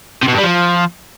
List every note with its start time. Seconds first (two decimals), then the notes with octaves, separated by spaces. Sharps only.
0.23 C3
0.28 B2
0.33 G2
0.38 G3
0.43 F3